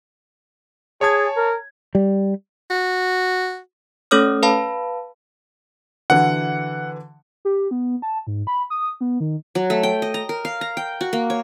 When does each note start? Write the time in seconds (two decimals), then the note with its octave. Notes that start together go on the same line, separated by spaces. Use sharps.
1.01 G#4 C#5 A5 G#6
1.37 A#4
1.95 G3
2.70 F#4
4.11 A3 C#4 A4 C#5 D#6 F6
4.43 B4 F5 A5 B5
6.10 D3 E3 F#4 F#5
7.45 G4
7.71 B3
8.02 A5
8.27 G#2
8.47 B5
8.70 D#6
9.01 B3
9.20 D#3
9.55 F#3
9.70 A3
9.83 G5
10.02 D#5
10.14 A#5
10.29 A#4
10.45 F5
10.61 A#5
10.77 G5
11.01 F#4
11.13 A#3
11.30 C#5